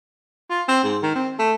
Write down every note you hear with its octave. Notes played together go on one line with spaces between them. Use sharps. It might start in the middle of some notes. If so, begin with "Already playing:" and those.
F4
C4
G#2
D#3
C4
A3